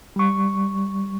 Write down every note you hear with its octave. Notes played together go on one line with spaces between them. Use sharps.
G3 C#6